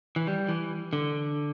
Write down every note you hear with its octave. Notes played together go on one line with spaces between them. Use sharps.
E3
G3
E3
D3